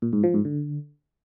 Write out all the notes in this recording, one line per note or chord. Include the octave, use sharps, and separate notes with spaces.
A#2
G#2
F3
G#2
D3